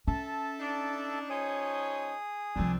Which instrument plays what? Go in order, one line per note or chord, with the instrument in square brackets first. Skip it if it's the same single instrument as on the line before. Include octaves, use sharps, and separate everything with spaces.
[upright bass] C#4 [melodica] A4 E5 A5
[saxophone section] D4 D#4
[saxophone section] F3 D#4 C#5 [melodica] G#4 D#6
[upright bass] C2 F3 [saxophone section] A#2 C4 D4